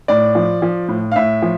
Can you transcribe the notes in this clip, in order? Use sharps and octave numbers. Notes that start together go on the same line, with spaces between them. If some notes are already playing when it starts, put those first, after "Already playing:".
A2 D5
F3
F3
A2
F5
A2 E5
F3